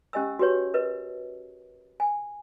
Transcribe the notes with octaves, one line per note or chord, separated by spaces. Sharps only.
C#4 G4 D#5 G#5 E6
F#4 G4 B4 C#5
A#4 B4 D#5
G#5